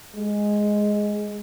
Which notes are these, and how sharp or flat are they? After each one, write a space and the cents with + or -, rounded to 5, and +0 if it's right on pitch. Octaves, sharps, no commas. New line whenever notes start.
G#3 +0